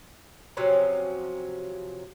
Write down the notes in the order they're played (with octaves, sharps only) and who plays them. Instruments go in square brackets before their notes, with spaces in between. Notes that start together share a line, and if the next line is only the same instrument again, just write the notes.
[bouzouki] C3 F3 F#3 C#4